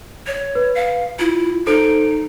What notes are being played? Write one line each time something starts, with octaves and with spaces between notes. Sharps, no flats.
C#5
B4
F5
E4 F4
D#4 A4 C5 D7